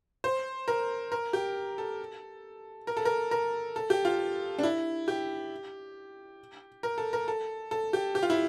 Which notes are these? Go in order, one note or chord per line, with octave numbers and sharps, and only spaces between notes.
C5
A#4
A#4
G4
A4
A#4
A4
A#4
A#4
A4
G4
F4
D4
E4
G4
A#4
A4
A#4
A4
A4
G4
G4
F4
E4